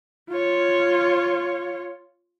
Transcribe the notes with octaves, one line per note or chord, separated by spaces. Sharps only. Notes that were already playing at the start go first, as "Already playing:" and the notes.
F4 C#5